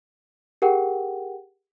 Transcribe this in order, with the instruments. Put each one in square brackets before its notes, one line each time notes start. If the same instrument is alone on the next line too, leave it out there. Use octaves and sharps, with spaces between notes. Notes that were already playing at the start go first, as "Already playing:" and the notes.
[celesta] G4 G#4 A#4 F#5 G5